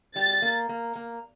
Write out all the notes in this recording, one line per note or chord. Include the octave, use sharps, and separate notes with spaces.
G3 A6
A#3
A#3
A#3